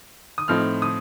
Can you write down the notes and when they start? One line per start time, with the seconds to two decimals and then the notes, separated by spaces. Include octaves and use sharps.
0.38 D#6
0.48 A2 F3 C4 D#4 F6
0.82 D#6